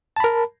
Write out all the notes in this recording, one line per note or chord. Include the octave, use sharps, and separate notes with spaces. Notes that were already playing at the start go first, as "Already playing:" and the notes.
A#4 A5 B5